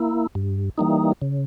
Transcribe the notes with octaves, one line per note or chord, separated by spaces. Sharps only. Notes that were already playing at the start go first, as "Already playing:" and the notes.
Already playing: A#3 E4
G2
E3 G3 A#3 D#4
C#3